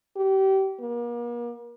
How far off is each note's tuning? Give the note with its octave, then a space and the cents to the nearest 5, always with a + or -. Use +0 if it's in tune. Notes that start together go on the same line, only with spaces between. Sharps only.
G4 -30
A#3 +40